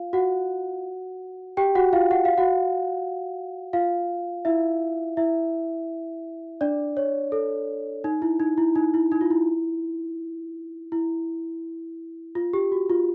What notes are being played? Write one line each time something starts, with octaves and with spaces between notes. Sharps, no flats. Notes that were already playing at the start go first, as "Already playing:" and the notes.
Already playing: F4 F5
F#4 F#5
G4 G5
F#4 F#5
F4 F5
F#5
F5
F#4 F#5
F4 F5
E4 E5
E4 E5
D4 D5
C#5
A4
D#4
E4
D#4
E4
D#4
E4
D#4
F4
E4
E4
F4
G4
F#4
F4